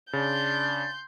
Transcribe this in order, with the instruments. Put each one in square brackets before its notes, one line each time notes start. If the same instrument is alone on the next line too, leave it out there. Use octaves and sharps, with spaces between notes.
[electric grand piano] C#3 [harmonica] D4 [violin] C6 G6 [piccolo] A6